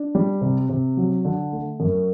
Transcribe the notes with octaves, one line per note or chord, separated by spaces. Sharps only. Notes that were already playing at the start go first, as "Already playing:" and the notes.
Already playing: D4
G3
C3
C3
F#3
D3
A3
F#2